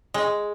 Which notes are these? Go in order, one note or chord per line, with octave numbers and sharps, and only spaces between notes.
G#3